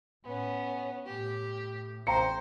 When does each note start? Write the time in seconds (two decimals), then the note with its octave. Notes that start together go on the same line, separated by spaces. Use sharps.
0.25 A2 B3 C#4
1.06 A2 G4
2.07 A1 C5 G5 A#5 C#7